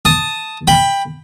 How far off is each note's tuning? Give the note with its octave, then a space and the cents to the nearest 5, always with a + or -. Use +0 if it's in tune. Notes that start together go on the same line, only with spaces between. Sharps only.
A5 +0 D#6 +0
G5 +20 B5 +0